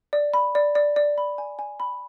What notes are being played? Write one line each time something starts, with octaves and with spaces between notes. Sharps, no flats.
D5
B5
D5
D5
D5
B5
G#5
G#5
B5